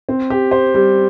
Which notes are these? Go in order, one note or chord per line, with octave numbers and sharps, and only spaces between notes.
C4
G4
C5
G3